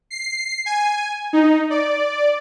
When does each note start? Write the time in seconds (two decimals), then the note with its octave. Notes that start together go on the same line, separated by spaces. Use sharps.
0.11 C7
0.66 G#5
1.33 D#4
1.70 D5